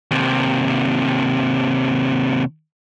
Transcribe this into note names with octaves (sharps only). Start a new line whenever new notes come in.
D#2 C3